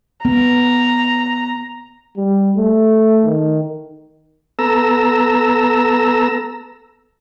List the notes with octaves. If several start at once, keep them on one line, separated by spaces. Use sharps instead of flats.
B3 A#5
G3
A3
D#3
B3 A4 A#5 E6